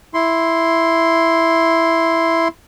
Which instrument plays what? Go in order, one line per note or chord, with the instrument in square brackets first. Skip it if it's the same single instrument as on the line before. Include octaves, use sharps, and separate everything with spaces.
[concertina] E4 C6